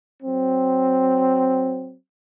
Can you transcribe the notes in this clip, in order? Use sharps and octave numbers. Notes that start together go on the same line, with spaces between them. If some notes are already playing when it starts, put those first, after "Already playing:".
F#3 C4